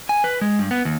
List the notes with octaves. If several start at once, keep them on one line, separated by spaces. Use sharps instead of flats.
G#5
B4
G#3
G2
B3
D#2